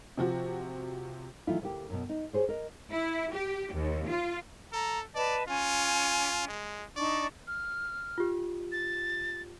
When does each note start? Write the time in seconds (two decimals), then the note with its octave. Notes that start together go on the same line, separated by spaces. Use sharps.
0.17 C3 F3 F#4
1.47 D#3 E3 F#3 A3 E4 F4
1.62 D2 A#3 G4
1.90 F#2 B2
2.09 D#4
2.33 G4 G#4 C5 C#5
2.49 A#4 D#5
2.90 E4
3.32 G4
3.73 D#2
4.07 F4
4.72 A4 A#5
5.15 B4 D5 D#5 A5
5.48 C#4 F4 G#5
6.48 G#3
6.96 D4 D#4 D5 C#6
7.47 F6
8.18 F4 G4
8.72 A6